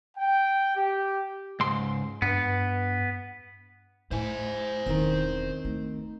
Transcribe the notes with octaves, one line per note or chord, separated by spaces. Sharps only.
G5
G4
C#2 G#2 C6
G2 B3
A2 E4 C5 G#5
E1 D#3 C4 C#4
A3 D#4